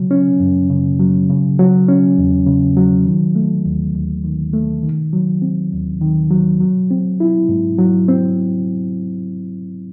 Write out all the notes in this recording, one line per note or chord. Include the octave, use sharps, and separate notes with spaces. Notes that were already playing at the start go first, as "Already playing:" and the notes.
Already playing: C#3 F#3
C#4
F#2
C#3
F#3
C#3
F#3
C#4
E2
C#3
F#3
D#3
A3
D#2
D#2
D#3
A3
D#3
F#3
C4
D#2
D#3
F#3
F#3
C4
E4
G#2
F#3
C4